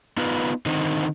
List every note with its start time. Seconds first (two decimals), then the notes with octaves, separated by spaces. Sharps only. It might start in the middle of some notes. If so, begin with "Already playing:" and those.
0.17 B3 D#4 F4 B4
0.66 D3 D#3 C4 D#4